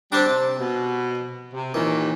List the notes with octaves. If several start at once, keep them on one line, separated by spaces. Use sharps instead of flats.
G3 C4 D4 C5 D6
C3
B2
C3
D#2 A#2 D#3 E3